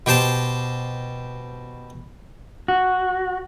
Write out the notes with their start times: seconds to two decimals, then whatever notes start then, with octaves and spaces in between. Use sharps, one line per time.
0.06 B2 G4 C5 A5
2.68 F#4